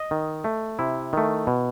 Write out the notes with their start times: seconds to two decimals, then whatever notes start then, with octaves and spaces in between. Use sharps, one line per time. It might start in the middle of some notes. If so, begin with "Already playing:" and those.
Already playing: D#5
0.11 D#3
0.44 A3
0.79 C3 E4
1.13 D#3 A3
1.47 B2